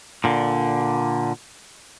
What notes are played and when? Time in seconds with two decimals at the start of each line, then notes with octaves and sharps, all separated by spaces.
0.24 A#2 D3